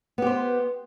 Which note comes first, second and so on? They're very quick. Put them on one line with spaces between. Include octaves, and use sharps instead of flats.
B3 G4 C5